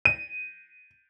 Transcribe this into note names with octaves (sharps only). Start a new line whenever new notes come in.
D#7